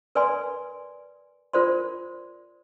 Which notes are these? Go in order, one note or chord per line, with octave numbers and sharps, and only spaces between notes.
A#4 B4 D5 G#5 C6
F4 A#4 C5 D5 C6